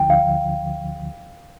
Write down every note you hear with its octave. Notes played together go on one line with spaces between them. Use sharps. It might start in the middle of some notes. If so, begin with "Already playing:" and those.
Already playing: D2 D3 F3 G5
F5